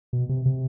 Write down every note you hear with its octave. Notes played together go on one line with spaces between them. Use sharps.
B2
C3
C3